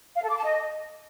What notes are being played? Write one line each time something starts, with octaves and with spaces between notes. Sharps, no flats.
F5
A4
D6
A5
D#5